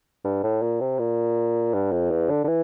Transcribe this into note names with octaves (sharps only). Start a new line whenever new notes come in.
G2
A2
A#2
C3
A#2
G2
F2
E2
D3
D3
E3